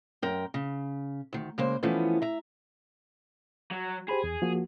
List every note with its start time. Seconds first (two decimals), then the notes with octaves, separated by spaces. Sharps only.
0.22 F#2 A#4 G5
0.54 C#3
1.33 D2 D#3
1.58 C#3 G#3 A#3 C5
1.83 E3 F3 A3 B3 C#4
2.22 E5 A#5
3.71 F#3
4.09 G4 G#4 C5 B5
4.24 E2
4.42 F3 A#3 F#4